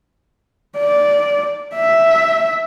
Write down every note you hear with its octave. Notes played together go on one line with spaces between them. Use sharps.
D5
E5